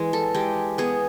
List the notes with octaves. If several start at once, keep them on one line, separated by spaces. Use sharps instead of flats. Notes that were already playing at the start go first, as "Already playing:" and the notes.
Already playing: E3 G#3
A4
G#3 G4
B3 G#4